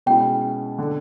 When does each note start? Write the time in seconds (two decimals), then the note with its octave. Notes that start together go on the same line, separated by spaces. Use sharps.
0.06 B2 G#3 C#4 E4 G5
0.78 D3